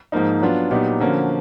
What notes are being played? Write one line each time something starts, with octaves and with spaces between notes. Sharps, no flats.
G#2 F3 A#3 D#4
F#3 B3 D4 F4
A#2 F#3 B3 D#4 G4
D3 F3 A#3 C#4 F#4